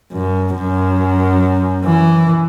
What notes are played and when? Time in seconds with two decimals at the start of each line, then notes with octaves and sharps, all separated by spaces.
0.12 F#2
0.56 F#2
1.85 E3